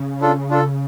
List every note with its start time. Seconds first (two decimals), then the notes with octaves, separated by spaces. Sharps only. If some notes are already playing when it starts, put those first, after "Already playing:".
Already playing: C#3
0.21 D4 F4 A4
0.49 D4 F4 A4